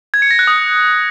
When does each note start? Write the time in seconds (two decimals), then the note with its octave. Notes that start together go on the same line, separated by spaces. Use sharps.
0.14 G#6
0.22 C#7
0.31 A#6
0.39 F#6
0.47 D#6